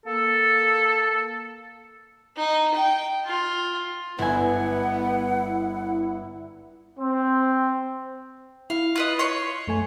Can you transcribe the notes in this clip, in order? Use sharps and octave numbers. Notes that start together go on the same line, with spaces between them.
A#3 A4
D#4
G5
F4
G1 B3 E4 F#5 G#5
C4
E4 F5
F4 B4 D#5
C#5 C6
F#2 A3 G#5